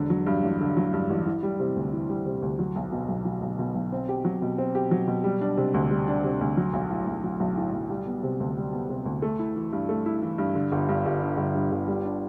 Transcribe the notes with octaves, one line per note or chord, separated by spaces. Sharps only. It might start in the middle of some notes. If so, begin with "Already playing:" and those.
Already playing: E1 D3
F#3
G2
A1
D3
F#3
G2
A1
E3
G3
C3
D2
E3
G3
C3
D2
F#3
B1
B2
B1
F#3
B1
B2
B1
C4
G4
F#3
B2
C4
G4
F#3
B2
G3
D4
C3
D2
G3
D4
C3
D2
F#3
B1
A2
B1
F#3
B1
A2
B1
G3
B3
C3
D2
G3
B3
C3
D2
A3
E4
E3
G2
A3
E4
E3
G2
D3
G1
G2
G1
D3
G1
G2
G1
G3
D4